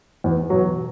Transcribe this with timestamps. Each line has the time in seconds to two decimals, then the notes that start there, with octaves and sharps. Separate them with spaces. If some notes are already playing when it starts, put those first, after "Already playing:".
0.24 E2
0.50 B2 F#3